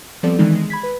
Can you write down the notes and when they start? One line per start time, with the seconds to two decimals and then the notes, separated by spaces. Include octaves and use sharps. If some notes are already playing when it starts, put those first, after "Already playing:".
0.23 F3 G3 B3 C4 A4 D5
0.39 D#3 E3 G#3 D#4
0.55 G#3
0.70 B5 G#6 B6
0.83 B4